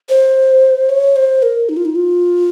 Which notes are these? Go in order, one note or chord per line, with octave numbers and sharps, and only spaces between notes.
C5
C#5
C5
A#4
D#4
F4
D#4
F4